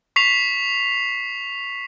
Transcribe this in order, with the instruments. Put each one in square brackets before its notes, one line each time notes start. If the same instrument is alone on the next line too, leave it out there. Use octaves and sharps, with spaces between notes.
[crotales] C#6 B6 C7 F7